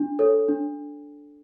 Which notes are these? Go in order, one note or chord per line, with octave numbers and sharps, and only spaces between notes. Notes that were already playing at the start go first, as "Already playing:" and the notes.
Already playing: D4
A4 C#5
D4